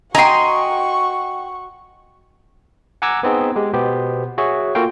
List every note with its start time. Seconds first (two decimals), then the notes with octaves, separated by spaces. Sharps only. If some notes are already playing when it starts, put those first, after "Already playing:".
0.15 F#4 D#5 G5 G#5 A#5 C6 C#6
3.02 F#5 G#5 A#5 D6 E6 G#6
3.23 B3 C4 D#4 G#4
3.55 G#3 G4
3.74 B2 B3 G4 C5
4.38 F#4 G#4 C#5 E5
4.75 A#3 F4 F#4 A4 F5 G5